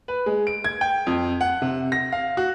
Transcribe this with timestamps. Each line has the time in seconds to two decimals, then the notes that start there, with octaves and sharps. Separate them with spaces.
0.08 B4
0.26 G#3
0.47 D7
0.64 G#6
0.81 G5
1.07 F2
1.41 F#5
1.62 C3
1.92 A#6
2.12 F5
2.37 F#4